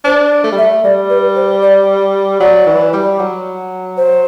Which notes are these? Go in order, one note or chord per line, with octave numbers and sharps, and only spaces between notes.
D4 C5
A3
G3
A3 E5
G3 D5
B4
C5
D5
F#3 D5
E3
G3
F#3
C5